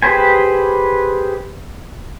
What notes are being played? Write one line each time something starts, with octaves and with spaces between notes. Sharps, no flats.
G4 G#4 B4 C5 G#5